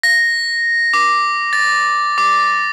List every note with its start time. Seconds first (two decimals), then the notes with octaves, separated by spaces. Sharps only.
0.03 A#6
0.94 D6
1.53 A6
2.18 D6